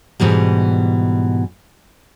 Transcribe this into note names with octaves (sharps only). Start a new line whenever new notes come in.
G#2 B2 E3 G3